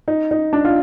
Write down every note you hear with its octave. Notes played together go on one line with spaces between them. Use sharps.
D#4
D#4
D4
F4